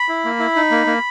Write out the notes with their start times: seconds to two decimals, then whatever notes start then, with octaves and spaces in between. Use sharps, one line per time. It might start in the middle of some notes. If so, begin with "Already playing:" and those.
Already playing: B5
0.09 E4
0.25 A#3
0.39 E4
0.56 D#4
0.71 A#3
0.87 A#3